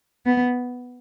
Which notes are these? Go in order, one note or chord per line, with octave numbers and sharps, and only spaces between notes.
B3